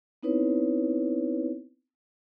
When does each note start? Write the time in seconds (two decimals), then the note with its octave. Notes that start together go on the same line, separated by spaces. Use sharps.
0.23 B3 C4 D#4 E4 B4 C#5